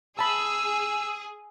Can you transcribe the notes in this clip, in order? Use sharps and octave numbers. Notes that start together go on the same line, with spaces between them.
G#4 A5 B5 E6